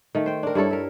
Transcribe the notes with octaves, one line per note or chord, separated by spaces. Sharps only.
D#3 A3
C5 G5
D4 A#4
G2 E4 A4 C#5
A#4 E5